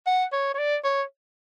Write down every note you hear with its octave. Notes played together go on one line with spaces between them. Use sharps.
F#5
C#5
C#5
D5
C#5